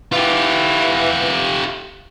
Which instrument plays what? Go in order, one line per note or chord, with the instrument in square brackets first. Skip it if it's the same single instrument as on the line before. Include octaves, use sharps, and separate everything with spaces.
[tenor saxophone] E3 [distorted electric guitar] F4 G4